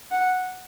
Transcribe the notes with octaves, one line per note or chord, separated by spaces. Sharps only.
F#5